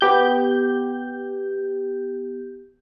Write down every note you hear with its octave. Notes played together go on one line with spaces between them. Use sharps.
B3 G4 G6